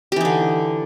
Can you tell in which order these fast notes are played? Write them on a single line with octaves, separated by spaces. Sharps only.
G4 E3 D#4 D3